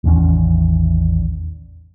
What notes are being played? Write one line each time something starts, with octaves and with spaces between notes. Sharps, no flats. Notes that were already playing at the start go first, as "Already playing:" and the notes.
A1 E2 D#3 C#4